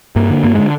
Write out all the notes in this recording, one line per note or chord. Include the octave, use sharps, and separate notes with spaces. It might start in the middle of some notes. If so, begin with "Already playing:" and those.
G2 A#3
D3
G2 A#3
D3 G#3